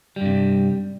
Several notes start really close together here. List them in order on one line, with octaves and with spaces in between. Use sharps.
G3 G2 C3